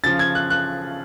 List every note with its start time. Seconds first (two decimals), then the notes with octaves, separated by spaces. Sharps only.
0.04 C#3 F3 A6
0.19 G#6
0.35 F#6
0.50 F#6